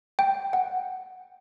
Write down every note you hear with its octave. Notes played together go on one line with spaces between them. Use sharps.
G5
F#5